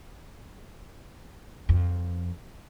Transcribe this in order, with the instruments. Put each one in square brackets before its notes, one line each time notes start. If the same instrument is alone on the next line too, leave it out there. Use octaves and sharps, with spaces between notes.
[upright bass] F2